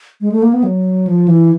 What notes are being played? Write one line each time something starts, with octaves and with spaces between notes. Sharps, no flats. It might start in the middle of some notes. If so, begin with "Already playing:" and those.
G#3
A3
A#3
B3
F#3
F3
E3